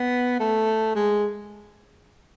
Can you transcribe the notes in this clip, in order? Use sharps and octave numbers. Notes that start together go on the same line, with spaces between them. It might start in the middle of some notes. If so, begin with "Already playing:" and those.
Already playing: B3
A3
G#3